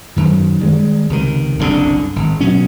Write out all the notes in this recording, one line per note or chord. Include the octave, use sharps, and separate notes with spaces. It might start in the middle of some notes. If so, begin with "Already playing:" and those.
F#2 D#3
D#3 E3 G3 G#3
C#2 C3 D#3
F#1 C2 A#2 D3
G#1
B2 F#3 C#4